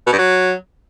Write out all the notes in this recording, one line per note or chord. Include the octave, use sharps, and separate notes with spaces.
B2
G2
F#3